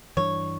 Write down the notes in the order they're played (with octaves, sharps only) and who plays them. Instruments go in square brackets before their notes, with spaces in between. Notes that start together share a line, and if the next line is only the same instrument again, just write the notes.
[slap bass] G2 E3 G3 D4 [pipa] C#5